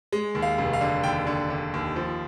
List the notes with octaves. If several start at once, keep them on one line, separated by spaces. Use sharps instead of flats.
G#3
D#2
F5
F1
F5
D3
D#2 G5
D3
D3
D#2
F3